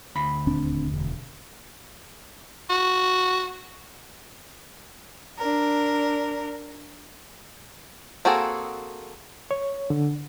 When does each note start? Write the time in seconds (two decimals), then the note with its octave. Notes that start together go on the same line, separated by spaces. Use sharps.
0.15 D2 B5
0.47 D#1 C4 D4
0.92 E1
2.70 F#4
5.39 D4 A#4
8.25 A#3 C4 F#4 G#4 A4
9.51 C#5
9.90 D3